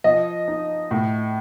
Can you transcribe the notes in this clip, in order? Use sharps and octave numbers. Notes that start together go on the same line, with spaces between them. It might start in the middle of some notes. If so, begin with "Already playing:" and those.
F3 D#5
D#4
A2